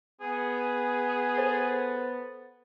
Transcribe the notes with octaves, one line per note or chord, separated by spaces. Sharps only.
B3 G#4
A4 C5 A6